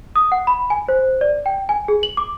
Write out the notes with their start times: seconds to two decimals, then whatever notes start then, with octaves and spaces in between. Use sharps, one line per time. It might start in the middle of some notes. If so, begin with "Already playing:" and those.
0.16 D#6
0.32 F#5
0.47 B5
0.70 G#5
0.88 C5
1.21 D5
1.46 G5
1.69 G#5
1.88 G#4
2.03 F#7
2.17 D6